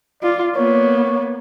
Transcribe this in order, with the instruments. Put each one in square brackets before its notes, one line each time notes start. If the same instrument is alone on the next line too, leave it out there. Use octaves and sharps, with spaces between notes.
[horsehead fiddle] F4 [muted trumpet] D5
[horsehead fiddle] A#3 B3 [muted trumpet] C#5